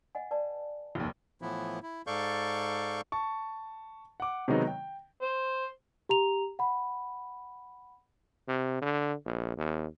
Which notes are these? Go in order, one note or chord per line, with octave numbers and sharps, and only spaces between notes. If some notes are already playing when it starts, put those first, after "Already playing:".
D#5 F#5 G#5
B4 D5 A5
F1 D#2
A2 E3 F3 B3 E4
E4
G#2 A4 D5 F5 C#6 G6
A5 C#6
F#5 D6
C3 D#3 F#3 G#3 B3 D#4
G5
C5
G4 A#5 F7
F#5 B5
C3
D3
A#1
D#2